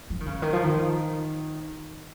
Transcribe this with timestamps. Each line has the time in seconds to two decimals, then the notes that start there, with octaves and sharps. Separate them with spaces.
0.10 F3
0.20 D#3
0.26 C#3
0.42 D#3
0.53 F3
0.64 D#3